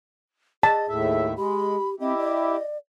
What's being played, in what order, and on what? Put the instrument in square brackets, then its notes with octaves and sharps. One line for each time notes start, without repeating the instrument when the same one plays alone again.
[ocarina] G#4 [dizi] D#5 [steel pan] A5
[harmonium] D#2 A2 E5 [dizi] A4
[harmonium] G#3 [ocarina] G4 [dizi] B5
[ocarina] C4 [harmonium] E4 G4 [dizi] D#5
[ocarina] D5